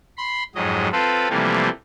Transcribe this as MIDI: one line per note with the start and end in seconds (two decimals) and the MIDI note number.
0.17 0.43 83
0.17 0.43 84
0.55 0.88 41
0.55 0.88 44
0.55 0.88 54
0.55 0.88 75
0.92 1.28 60
0.92 1.28 65
0.92 1.28 69
0.92 1.28 71
1.30 1.69 48
1.30 1.69 52
1.30 1.69 53
1.30 1.69 55
1.30 1.69 57
1.30 1.69 58